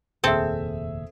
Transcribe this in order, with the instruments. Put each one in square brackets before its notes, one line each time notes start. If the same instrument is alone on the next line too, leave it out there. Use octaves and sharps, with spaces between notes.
[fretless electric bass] F1 D#2 A#2 [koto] C4 A4 [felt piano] G#4 E5